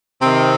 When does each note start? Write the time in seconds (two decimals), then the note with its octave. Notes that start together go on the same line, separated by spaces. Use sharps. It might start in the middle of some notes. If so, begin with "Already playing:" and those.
0.21 C3 D#3 C4